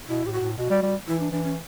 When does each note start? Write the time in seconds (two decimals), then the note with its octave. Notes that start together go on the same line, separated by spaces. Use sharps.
0.08 B2 E4
0.25 A2 G4
0.33 F#4
0.41 A2
0.58 B2 F#4
0.70 G3
0.82 G3
1.07 E3 E4
1.20 D4
1.32 E3 D4
1.44 C#4